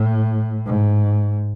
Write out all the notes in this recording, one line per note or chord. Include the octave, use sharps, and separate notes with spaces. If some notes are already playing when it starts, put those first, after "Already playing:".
Already playing: A2
G#2